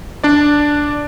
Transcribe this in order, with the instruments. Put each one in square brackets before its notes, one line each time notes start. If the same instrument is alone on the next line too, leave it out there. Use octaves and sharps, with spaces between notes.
[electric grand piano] D4 D5